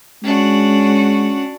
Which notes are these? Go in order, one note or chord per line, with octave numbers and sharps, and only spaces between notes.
G#3 C#4 D4 F#4